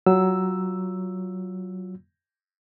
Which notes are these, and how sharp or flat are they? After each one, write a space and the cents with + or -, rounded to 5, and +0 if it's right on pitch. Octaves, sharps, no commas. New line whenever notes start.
F#3 +15 F4 +20 E6 +0